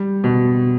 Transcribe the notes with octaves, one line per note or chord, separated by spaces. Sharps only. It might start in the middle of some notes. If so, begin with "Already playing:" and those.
Already playing: G3
B2